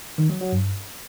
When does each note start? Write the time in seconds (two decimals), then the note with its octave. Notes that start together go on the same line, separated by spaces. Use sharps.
0.18 D#3
0.30 F#3
0.41 F#3
0.52 G2